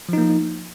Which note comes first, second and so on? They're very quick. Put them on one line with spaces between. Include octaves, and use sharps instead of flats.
F3 D#4 A#3